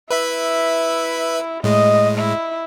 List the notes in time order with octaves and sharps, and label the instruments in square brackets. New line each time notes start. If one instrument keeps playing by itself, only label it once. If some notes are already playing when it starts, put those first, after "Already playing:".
[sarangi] E4 [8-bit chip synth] B4 E5 B5
[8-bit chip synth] A2 G#3 [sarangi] D#5
[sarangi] E4